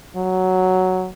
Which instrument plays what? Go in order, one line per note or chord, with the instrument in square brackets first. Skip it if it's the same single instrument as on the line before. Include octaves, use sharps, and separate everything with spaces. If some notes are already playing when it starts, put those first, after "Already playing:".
[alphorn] F#3